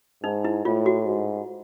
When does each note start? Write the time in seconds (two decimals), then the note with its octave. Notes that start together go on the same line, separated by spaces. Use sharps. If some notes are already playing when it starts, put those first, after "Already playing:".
0.24 G#2 D#4
0.44 E4
0.65 A2 F4
0.86 F#4
1.06 G#2